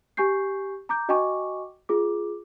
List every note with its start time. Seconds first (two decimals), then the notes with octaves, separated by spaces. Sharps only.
0.17 G4 G#5 C#6 G6 C7
0.89 A#5 D6 G6
1.09 F#4 D#5 G5 G#5 C#6 D6
1.89 F4 G#4 D6